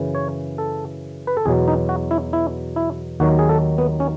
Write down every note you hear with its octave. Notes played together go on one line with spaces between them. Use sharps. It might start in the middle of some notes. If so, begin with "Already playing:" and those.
Already playing: F#2 C#3 E3
C#5
A4
B4
A4
E2 B2 F#3 G#4
D#4
F#4
E4
E4
E4
D#2 D#3 F#3 F#4
G#4
A4
B3
C#4